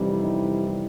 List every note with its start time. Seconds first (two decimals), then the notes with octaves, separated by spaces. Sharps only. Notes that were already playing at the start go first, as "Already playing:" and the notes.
Already playing: F2 C3 E3 G3 D#4
0.12 E4
0.23 D#4
0.64 E4